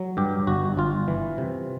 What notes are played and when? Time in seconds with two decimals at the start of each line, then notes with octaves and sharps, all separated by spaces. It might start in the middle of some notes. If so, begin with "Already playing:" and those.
Already playing: F#3
0.17 G2 G4
0.47 G1 F#4
0.77 G1 F4
1.08 E3
1.38 C3